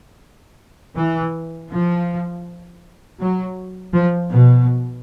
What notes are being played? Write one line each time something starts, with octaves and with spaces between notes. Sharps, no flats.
E3
F3
F#3
F3
B2